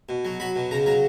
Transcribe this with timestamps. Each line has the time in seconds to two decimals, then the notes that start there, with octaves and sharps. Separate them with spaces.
0.09 B2
0.25 F#3
0.40 F#3 B5
0.56 B2
0.71 C#3 A#5
0.86 F#3 A#5